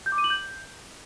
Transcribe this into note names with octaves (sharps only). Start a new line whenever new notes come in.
G6
D6
D#7
F#7
G6